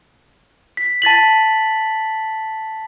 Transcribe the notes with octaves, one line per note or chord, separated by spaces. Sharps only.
B6
A5 A6 B6 F#7